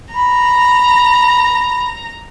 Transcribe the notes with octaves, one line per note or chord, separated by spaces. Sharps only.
A#5 B5